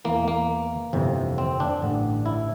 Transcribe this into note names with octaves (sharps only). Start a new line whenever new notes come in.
E2 E3 A#3
A#3
G1 F2 C3 E3
C4
D4
A1 G2 D3
E4